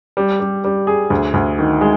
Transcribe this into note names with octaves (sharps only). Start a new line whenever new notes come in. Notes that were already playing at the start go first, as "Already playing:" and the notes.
G3
G3
G3
G#4
D2
D2
D#3
G#3